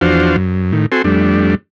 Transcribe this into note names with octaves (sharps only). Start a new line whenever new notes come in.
E2 F3 D4 F#4 C5 F5
F#2
A2 D#3
C4 F#4 A4 G#5 C6
F2 G3 A3 D4